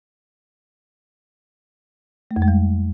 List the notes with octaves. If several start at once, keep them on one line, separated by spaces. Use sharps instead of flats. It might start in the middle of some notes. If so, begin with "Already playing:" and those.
A3
F2
G#3
G3